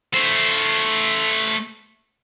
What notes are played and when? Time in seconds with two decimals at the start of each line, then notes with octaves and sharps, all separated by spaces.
0.13 A3 C5